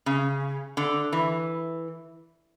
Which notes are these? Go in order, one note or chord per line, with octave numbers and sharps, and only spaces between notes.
C#3
D3
E3